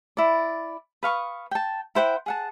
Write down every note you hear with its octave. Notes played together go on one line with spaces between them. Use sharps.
E4 D5
B4 F5 C#6 D#6
G5 A5
E4 C5 F#5 G5
G#4 F#5 A5